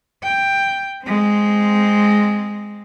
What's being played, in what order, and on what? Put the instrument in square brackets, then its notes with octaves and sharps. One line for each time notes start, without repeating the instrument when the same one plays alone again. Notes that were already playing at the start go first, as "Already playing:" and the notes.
[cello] G5
G#3 C4